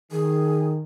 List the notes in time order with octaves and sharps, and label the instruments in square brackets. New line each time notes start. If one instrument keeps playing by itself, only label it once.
[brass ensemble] D#3 [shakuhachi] G#4